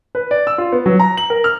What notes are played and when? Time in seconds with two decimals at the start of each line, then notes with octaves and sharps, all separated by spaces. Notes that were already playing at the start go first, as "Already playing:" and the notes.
0.15 B4
0.31 D5
0.47 E6
0.58 F4
0.72 B3
0.86 F#3
1.00 A#5
1.17 F#7
1.30 A#4
1.44 F6